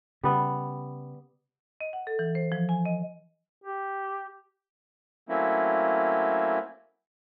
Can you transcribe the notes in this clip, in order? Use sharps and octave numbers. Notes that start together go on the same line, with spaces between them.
C#3 G3 B3
D#5
F#5
A4
E3
C5
F3
G#5
D#5
G4
F#3 A3 A#3 C4 C#4 E4